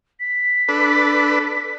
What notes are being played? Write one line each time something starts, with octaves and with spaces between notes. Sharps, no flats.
B6
D4 A4 B4